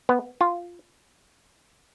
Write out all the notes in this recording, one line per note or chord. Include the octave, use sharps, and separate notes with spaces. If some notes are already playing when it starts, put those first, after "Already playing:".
B3
F4